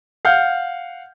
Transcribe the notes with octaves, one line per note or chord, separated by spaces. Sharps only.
F5 F#5 F6 G6